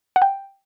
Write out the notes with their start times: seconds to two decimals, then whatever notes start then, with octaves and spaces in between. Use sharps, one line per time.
0.16 F#5
0.22 G5